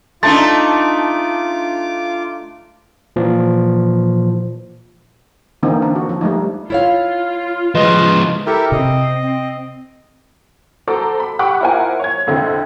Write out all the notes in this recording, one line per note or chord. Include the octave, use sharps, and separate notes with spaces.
A3 D4 D#4 F4 A5 C6 D6 A6
A#2 E3 F3
D3 E3 A#3 C4 D#4
D4
F#4
F3
G3 A3 D#4
E4 F4 C#5 F5
F3 G#3 B4 D#5 C6
E4 G4 A4 A#4
C3 C4 D#5
C4
F#4 A4 C5 A#5 D6
B5
G4 F#5 B5 C#6 D6 F#6
E4 F4 A#4 C5 F#5 G#5
C#5 G#6
F2 D3 C4 E4